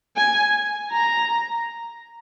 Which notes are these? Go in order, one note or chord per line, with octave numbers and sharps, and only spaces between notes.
G#5
A#5